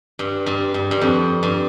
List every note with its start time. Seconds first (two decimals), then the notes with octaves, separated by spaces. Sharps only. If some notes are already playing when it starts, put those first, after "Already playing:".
0.19 G2
0.46 G2
0.74 G2
0.91 G2
1.01 F2
1.43 G2